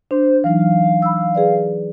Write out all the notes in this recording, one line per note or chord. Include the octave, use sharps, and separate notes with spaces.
D4 C5
E3 F#3 D#4 F5
B5 E6
G#4 B4 D5